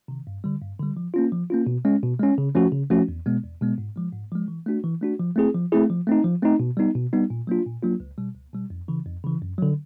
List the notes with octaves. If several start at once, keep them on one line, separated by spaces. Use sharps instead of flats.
C3 D#3
G2
D3 G3
G2
D3 G3
F3
A#3 C#4 F4
F3
A#3 C#4 F4
B2
G#3 C#4
B2
G#3 C#4
C#3
F3 A3 C#4 F#4
C#3
F3 A3 C#4 F#4
E2
B2 G#3 B3
E2
B2 G#3 B3
G#2
F3 G#3
G#2
F3 G#3
E3
A3 D4 F#4
E3
A3 D4 F#4
F3
A3 C4 E4 G#4
F3
A3 C4 E4 G#4
F3
A3 C4 D#4
F3
A3 C4 D#4
B2
G3 B3 D#4
B2
G3 B3 D#4
A#2
F#3 A#3 D4 F4
A#2
F#3 A#3 D4 F4
C#2
B2 G3
C#2
B2 G3
F2
C#3 E3
F2
C#3 E3
F#2
D3 F#3